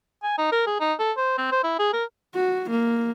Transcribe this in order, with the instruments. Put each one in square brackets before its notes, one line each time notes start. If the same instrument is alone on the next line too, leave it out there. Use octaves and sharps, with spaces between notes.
[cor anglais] G#5
D#4
A#4
G#4
D#4
A4
C5
C4
C5
E4
G#4
A#4
[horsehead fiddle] F#4
A#3